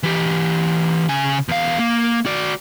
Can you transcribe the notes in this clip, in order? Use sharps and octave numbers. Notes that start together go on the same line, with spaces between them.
E3 G4
C#3 G#5
E2 F5
A#3
F#4 D5